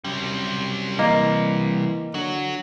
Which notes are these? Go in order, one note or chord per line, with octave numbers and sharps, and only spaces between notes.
F#2 C3 G3
E3 A#3 D#5
D3 F#3 F#4